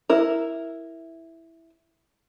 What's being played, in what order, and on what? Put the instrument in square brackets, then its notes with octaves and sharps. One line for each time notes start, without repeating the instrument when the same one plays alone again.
[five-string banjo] E4 A#4